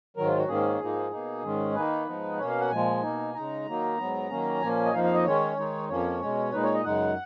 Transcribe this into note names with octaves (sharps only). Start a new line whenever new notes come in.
G#2 D#3 F#3 A#4
F4
F#4
G#2 D#3 A#3 C#4 G#4
G#2 F3 A#3 D#4
B2 A#3 D#4
G#2 D#3 G#3 C#4
D#3 A#3 D#4 B4
G#2 F3 B3 D#4
B2 A#3 C#4 C#5
F5
F#5
A#2 F3 G#3 G#5
B2 A#3 D#4
C#3 G#3 D#4 A#5
D#3 F#3 A#3 D#4
G#2 F#3 B3
D#3 F#3 A#3 C#4
A#2 F3 A#3 C#4 G#5
D#5
F2 F3 A#3 D#4 F5
F5
D#5
D#3 G#3 C#4 C#5
D#3 G#3 D#4
F2 F3 A#3 C#4 C#5
B2 G#3 C#4
A#2 G#3 D#4 B4
C#5
D#5
F#2 C#3 G#3 D#4 F#5